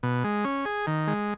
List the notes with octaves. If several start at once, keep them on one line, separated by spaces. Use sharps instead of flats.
B2
G#3
C#4
G#4
D#3
G#3